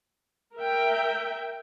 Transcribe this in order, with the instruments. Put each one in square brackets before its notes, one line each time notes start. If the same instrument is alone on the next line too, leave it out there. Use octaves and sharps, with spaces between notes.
[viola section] A#4 E5 G5